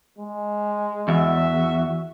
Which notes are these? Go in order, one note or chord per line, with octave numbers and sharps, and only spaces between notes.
G#3
E2 F#4 E5